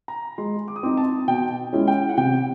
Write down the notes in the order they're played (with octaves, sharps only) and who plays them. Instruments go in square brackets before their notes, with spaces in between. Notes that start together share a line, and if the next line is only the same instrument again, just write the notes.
[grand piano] A#5
[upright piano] G#3 [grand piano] C6
[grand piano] D6
D#6
[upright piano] C4 D#4 [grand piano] D6
[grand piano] A5
[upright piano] B2 [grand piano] G5
[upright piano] G#3 C#4 E4
[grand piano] G5
F#5
[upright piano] C3 [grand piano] G5